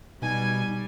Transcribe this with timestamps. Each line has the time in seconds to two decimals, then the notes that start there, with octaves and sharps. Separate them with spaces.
0.22 B2 G3 D#4 G#5